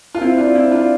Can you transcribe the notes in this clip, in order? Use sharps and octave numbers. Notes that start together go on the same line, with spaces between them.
F4
C4 E4
D4 F4
C4 E4
D4 F4